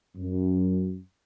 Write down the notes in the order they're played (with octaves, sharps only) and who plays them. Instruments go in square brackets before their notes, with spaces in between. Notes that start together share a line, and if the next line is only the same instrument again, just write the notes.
[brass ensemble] F#2